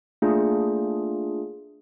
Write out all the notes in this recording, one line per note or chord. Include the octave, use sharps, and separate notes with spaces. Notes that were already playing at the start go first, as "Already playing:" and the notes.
A3 A#3 D4 F4 G#4